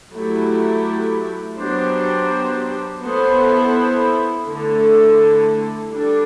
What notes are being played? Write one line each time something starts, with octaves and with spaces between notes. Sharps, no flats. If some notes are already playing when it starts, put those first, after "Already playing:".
F#3 A3 E4 G4
F#3 B3 D4 G4 C5
B3 E4 A4 C5
D3 A3 E4 A4
G3 D4 A4